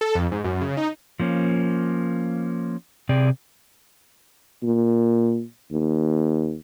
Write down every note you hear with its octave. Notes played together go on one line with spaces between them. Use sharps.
A4
F2
G#2
F#2
C#3
D#4
F3 A#3 C#4
C3 C4 G#4 D5
A#2
D#2